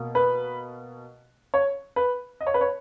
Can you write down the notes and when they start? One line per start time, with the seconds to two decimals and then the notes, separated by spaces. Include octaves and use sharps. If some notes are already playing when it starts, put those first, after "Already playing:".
Already playing: B2 A#3
0.15 B4
1.54 C#5
1.96 B4
2.41 D#5
2.47 C#5
2.54 B4
2.61 C#5